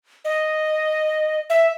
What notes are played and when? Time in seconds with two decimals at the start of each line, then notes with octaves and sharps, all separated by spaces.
0.25 D#5
1.50 E5